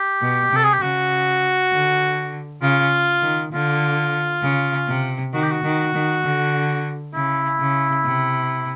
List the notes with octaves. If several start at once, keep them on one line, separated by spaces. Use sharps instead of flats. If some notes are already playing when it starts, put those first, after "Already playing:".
Already playing: G4
B2
C3 A4
G#4
G4
C#3 F#4
D3
C#3 F4
D#3
D3 F4
C#3
C3
D#3 F#4
G4
F#4
D#3
D#3
D3
C#3 E4
C#3
C3